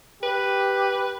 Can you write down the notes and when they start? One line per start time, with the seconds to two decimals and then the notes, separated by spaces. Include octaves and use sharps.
0.23 G4 B4